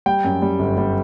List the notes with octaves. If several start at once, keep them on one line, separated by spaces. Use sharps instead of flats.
G3 G5
F#2
G3
G1
G3